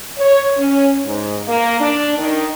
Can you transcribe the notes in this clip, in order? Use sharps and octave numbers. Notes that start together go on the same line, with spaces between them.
C#5
C#4
G#2
A#3
D4
D#3